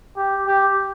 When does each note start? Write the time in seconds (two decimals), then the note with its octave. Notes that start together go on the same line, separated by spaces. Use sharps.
0.16 G4
0.47 G4